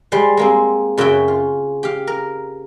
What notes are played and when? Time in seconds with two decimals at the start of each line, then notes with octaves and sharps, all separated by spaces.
0.12 G3 G#3 C5
0.37 G#3 A#3 C4
0.98 F#2 C#3 F#4 E5 G5
1.28 F4
1.83 G4 F5
2.07 A#4